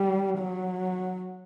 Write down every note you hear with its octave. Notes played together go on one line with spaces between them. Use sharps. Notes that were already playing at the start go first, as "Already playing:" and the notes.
Already playing: G3
F#3